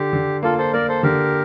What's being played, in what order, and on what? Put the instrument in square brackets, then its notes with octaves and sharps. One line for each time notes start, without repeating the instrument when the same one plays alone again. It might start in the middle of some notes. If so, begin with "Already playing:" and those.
Already playing: [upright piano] D3 [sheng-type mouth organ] G4
[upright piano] D3
[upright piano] A#3 [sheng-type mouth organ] F4 A4
[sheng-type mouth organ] A4 C5
[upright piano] A#3 [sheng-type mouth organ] A#4 D5
[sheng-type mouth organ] A4 C5
[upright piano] D3 [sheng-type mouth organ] G4 A#4